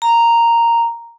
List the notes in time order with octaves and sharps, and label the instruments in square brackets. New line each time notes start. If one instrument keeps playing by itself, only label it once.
[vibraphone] A#5